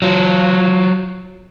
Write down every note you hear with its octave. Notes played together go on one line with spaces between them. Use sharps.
F#3 F4